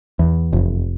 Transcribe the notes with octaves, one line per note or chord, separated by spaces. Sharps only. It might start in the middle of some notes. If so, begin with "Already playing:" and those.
E2
F1